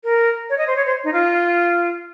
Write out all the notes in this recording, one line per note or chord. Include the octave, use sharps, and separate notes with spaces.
A#4
C#5
D#5
C5
C#5
C5
D#4
F4